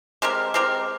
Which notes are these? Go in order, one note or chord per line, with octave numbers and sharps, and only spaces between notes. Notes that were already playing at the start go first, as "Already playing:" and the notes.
G#3 C4 G4 A#4
G#3 C4 G4 A#4